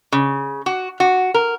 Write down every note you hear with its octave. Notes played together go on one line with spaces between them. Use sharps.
C#3
F#4
F#4
A#4